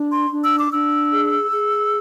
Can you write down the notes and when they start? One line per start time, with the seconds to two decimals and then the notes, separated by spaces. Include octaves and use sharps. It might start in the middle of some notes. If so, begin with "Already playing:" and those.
Already playing: D4
0.11 C6
0.31 D4
0.44 E6
0.59 D6
0.71 D4 E6
1.11 G#4
1.51 G#4